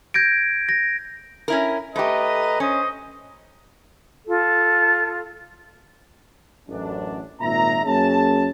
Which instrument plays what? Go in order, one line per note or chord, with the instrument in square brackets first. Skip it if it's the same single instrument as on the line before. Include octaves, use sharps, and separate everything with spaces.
[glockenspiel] G6 G#6 A#6 D7
A#6
[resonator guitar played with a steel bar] C#4 E4 A#4
[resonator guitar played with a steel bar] A3 G4 [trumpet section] B4 D#5 A#5
[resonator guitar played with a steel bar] C#4 [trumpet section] C5 D#5
[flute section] F4 A4
[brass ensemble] A1 F#2 D4
G#1 A#2 E5 A#5
F#2 A#3 C#4 G#4 A5